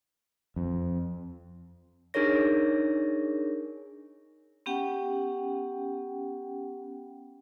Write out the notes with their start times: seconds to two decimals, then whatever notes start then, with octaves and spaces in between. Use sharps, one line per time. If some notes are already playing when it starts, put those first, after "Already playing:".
0.56 F2
2.14 D4 D#4 G#4 A#4 C#5 A#6
4.66 B3 C#4 G4 F#5 G5